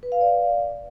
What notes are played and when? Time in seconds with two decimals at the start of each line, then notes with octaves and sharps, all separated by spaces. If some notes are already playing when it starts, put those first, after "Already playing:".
0.03 B4
0.12 F5
0.21 D5